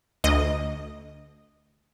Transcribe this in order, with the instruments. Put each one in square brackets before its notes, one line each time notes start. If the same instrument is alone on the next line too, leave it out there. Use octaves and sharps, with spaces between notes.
[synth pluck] D2 D#5